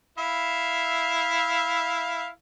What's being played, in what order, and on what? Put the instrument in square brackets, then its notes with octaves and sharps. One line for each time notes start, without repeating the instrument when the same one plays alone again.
[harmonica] E4 E5 F5